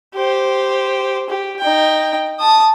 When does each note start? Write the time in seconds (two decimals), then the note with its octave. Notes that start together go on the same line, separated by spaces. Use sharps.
0.15 G4 C5
1.29 G4
1.59 D#4 G5
2.39 A5 D#6